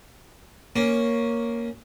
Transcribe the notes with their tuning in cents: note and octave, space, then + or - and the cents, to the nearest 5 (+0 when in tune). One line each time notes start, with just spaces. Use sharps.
A#3 +0 C#4 +0